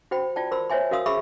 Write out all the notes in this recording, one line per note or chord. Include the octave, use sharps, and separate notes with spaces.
F#4 C5 G5 B5
F4 D5 G5 A5
A#4 C5 B5 C6 E6
C5 C#5 E5 G#5 C6
F#4 A#4 F5 C6 D#6 E6
F#4 G#4 E5 B5 C#6 E6